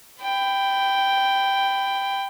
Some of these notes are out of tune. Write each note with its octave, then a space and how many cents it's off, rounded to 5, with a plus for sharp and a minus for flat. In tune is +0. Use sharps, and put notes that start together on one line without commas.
G5 +0 B5 +20